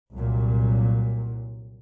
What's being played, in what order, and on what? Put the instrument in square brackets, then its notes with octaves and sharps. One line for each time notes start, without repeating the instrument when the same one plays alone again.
[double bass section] C2 A#2 F#3